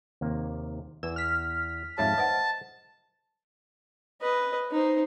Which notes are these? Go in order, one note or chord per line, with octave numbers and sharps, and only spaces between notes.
D#2 C3 A#3
E2 B4 E6
F6 B6
F2 G#2 G4 C#5 E5 F5 A5
B4 C5 D#5 F#5
B4 D#5
D#4 C5